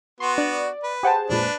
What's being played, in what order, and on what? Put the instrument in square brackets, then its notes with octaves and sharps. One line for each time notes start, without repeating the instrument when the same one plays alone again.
[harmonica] B3 F#4 [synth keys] C6
[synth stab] D4 [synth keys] D5
[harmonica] B4
[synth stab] G4 F#5 G5 [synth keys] G#4 C5 A5
[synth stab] F2 A#2 G#3 [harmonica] D4 B4